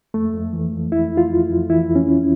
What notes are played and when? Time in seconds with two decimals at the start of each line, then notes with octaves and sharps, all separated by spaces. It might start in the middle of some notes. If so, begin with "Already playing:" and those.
0.14 F2 A3
0.34 F2
0.53 E3
0.72 F2
0.92 F2 E4
1.11 F2
1.17 F4
1.31 F2
1.50 F2
1.70 E3 E4
1.89 F2
1.95 C#4
2.08 F2